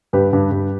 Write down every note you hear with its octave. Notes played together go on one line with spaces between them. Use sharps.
G2 G4 B4
G2
G2